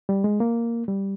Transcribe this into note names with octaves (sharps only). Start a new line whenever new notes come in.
G3
G#3
A#3
G3